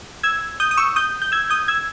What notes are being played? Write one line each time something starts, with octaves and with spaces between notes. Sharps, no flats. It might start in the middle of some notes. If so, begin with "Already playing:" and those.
E6 G#6
D#6 G6
D#6
C#6 E6
D#6 G6
G6
E6 G#6
D#6 G6
E6 G#6